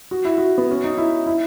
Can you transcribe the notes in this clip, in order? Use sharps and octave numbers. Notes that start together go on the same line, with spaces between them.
F#4
E4
F#4
B3
C#4
D#4
E4
E4